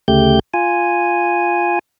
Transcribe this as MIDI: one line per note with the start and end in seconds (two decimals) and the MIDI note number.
0.08 0.39 38
0.08 0.39 49
0.08 0.39 57
0.08 0.39 67
0.08 0.39 91
0.54 1.79 65
0.54 1.79 80